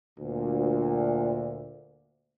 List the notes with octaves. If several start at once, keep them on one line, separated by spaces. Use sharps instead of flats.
D2 A#2